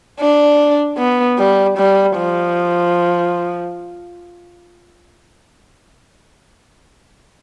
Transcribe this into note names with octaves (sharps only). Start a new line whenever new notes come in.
D4
B3
G3
G3
F3